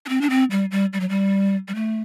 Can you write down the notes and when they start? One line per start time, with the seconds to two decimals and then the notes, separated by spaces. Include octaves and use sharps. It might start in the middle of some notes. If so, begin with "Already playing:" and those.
0.06 D4
0.09 C4
0.21 D4
0.30 C4
0.51 G3
0.71 G3
0.93 G3
1.00 F#3
1.09 G3
1.68 G3
1.75 A3